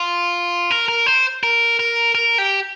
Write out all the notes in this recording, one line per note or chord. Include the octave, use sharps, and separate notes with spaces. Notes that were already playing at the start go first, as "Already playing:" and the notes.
Already playing: F4
A#4
A#4
C5
A#4
A#4
A#4
G4